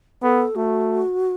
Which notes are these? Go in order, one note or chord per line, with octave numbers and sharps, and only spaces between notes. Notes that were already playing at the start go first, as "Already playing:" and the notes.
B3 A4
A3 F#4